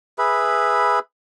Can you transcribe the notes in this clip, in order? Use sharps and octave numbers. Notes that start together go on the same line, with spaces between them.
G#4 B4 E5 B5